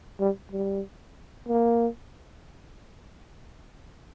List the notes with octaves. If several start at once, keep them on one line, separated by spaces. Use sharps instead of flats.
G3
G3
A#3